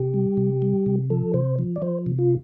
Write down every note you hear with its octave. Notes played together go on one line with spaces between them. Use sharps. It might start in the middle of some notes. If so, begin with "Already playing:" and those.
Already playing: C3 G4
G3
C3
G3
C3
F3 A4
C3 C5
F3
D5
F3 C5
C3
F4